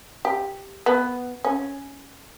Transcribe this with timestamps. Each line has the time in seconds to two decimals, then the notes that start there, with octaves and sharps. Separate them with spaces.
0.25 G4
0.86 B3
1.45 C#4